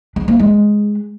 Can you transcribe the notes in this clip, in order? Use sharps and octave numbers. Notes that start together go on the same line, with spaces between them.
D4
A#3
G#3